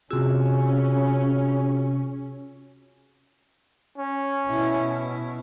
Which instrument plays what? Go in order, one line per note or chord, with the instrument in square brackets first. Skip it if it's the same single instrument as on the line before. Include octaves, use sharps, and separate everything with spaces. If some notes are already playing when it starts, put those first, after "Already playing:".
[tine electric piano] C3 E6 [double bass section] C#4 [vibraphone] F4 F#4 G#4
[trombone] C#4
[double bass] B2 E4